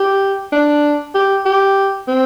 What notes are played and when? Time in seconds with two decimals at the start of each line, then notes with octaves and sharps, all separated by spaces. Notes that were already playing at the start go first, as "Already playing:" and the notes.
Already playing: G4
0.52 D4
1.15 G4
1.45 G4
2.08 C4